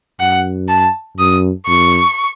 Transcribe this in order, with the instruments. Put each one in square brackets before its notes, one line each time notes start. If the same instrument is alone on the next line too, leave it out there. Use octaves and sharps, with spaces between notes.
[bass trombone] F#2 [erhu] F#5
[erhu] A5
[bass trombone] F#2 [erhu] D#6
[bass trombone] F2 [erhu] C#6